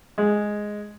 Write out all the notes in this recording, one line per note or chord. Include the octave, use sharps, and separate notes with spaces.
G#3